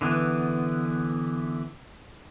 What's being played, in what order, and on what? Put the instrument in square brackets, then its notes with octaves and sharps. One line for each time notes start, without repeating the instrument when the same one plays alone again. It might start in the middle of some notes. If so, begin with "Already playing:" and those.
[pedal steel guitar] D3 E3 B3